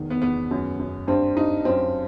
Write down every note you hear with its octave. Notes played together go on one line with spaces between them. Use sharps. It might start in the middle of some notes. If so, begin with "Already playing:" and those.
Already playing: E2 D#3
B3
E2 B3
F#2
F#2
G2 C4
G2 D#4
F#2 C4